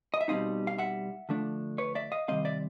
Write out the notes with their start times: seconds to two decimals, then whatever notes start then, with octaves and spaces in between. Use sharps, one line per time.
0.14 D#5
0.21 E5
0.28 B2 G3 C4 D#4 D#5 F5
0.67 F5
0.78 E5 F#5
1.29 D3 F3 A3 D4
1.78 B4 C#5
1.95 D5 E5
2.12 D#5 F5
2.28 C3 D#3 G3 C4 D#5 F5
2.45 D5 E5